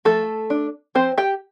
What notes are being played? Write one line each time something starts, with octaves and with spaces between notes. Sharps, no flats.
F3 A3 A4
D4
F3 C4 C5
G4 G5